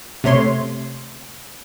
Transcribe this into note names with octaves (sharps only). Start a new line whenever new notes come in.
C3 A3 C#5 C6